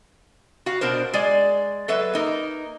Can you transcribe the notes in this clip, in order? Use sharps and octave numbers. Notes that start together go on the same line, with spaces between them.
F#4 F5
B2 D4 A#4 C5
G#3 D5 G#5
F#3 A4 B4 E5
A#3 D#4 A#4